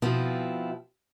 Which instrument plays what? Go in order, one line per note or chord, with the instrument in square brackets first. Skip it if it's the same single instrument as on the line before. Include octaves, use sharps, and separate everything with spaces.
[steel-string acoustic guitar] B2 F3 C4 E4 F4